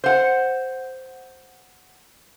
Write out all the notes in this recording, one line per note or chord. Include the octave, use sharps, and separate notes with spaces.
C5 F#5